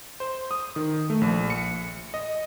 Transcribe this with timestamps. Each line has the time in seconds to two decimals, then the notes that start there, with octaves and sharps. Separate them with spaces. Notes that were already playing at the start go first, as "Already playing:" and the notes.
0.20 C5
0.51 D#6
0.76 D#3
1.10 A3
1.21 A#1
1.50 C#7
2.14 D#5